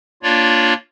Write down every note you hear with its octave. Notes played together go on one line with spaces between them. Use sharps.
A#3 D4 F4 C#5 D5